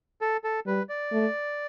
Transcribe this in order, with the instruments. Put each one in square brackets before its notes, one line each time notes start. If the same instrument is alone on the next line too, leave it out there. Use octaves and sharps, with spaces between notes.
[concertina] A4
A4
[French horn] G3 [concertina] B4
[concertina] D5
[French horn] A3